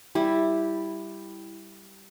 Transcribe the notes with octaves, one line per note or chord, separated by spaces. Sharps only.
G3 E4